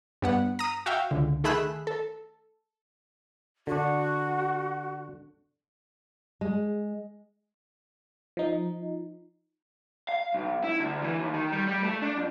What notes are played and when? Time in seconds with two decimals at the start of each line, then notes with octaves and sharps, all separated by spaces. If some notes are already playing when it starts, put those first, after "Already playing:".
0.22 G2 B3 F#5
0.59 A#5 D#6
0.86 F#4 E5 F5 G5
1.11 C#2 D3
1.44 D#3 A3 G#4 B5 E6 F#6
1.87 A4
3.67 D3 D4 F#4
6.41 G#3
8.37 F3 D#4
10.09 F5
10.34 B1
10.64 E4
10.80 D2
11.02 E3
11.19 D#2
11.34 D#3
11.52 G3
11.68 G3
11.84 A3
12.02 D4
12.17 F2